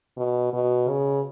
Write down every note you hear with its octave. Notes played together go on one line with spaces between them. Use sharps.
B2
B2
C#3